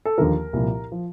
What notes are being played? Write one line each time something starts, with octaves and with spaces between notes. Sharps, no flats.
A4
D#2 D3 F3 A#4
C2 A#2 F3
F3